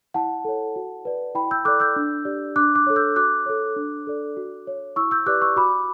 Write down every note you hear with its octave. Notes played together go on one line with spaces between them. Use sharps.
E4 F#5 A5
A4 C#5
F#4
B4 D5
E4 G5 B5
E6 G6
A4 D5 D6 F#6
E6 G6
D4
G4 D5
D4 D6 F#6
D6 F#6
A4 C#5
E6 G6
F#4 D6 F#6
A4 C#5
D4
A4 D5
F#4
C#5
E4 C#6 E6
E6 G6
G4 B4 D5 D6 F#6
C#6 E6
F#4 B5 D6